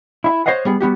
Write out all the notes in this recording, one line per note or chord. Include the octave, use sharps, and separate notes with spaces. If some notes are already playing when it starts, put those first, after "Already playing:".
E4 E5
C5 C#5 D#5 F5 F#5
G3 B3 G#4
G3 B3 F#4 G4